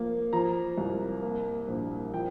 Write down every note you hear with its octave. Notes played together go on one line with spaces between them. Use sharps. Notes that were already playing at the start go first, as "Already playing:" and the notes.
Already playing: F3 A#3
F3 A#5
C2
A#3
A#1
F3 G5